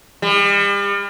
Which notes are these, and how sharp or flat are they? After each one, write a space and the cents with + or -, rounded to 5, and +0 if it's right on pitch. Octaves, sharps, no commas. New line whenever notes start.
G3 +40